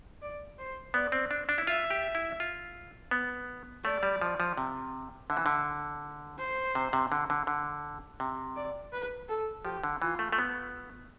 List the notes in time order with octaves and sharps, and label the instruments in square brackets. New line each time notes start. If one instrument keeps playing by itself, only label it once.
[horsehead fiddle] D5
C5
[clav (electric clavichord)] B3 [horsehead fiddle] D5
[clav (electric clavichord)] C4
D4
D4
E4
[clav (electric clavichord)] F4 [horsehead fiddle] E5
[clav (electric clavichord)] G4
E4
F4
B3
[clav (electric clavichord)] A3 [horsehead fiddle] D5
[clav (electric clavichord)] G3
F3
F3
C3
[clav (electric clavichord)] D3 [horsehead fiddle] E5
[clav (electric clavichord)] E3
D3
[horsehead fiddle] C5
[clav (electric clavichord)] C3
C3
D3
D3
D3
C3
[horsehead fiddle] D5
B4
A4
[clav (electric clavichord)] F3 [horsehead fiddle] G4
[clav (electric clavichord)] D3
[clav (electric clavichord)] E3 [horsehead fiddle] F4
[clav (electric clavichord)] A3
A3
B3